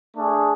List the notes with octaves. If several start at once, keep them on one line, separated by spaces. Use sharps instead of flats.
A3 D4 G#4